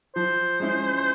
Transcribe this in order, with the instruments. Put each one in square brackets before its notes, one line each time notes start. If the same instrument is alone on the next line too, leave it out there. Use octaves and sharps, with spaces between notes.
[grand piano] F3 [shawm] C5
[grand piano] G#3 C#4 E4